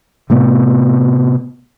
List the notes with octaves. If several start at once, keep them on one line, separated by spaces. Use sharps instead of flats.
A2 C3 A3 B3